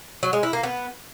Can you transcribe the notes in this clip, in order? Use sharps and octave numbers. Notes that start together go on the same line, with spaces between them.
F#3
G#3
E4
A#3
B3